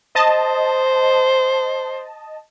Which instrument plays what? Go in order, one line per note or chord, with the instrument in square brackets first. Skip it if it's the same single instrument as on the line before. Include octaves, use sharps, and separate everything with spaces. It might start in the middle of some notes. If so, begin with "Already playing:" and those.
[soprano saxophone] C5 [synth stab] D#5 A5